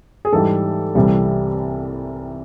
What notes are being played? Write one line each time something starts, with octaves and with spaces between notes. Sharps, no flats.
G#4
G#2 E3 G3 A4
C2 C3 E3 G3